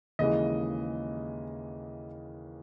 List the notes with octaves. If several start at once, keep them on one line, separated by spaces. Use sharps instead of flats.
D#2 C#3 E3 G#3 D#5